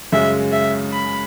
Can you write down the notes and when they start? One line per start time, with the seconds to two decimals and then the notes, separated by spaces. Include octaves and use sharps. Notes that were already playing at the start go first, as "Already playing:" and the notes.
0.12 F#2 C#3 G#3 C#4 E5
0.52 E5
0.92 B5